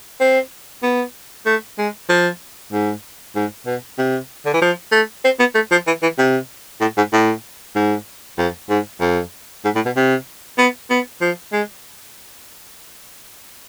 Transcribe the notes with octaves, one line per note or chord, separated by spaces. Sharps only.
C4
B3
A3
G#3
F3
G#2
G#2
B2
C3
D3
E3
F3
A3
C4
B3
A3
F3
E3
E3
C3
A2
G#2
A2
G#2
F2
G#2
F2
G#2
A2
B2
C3
B3
B3
F3
G#3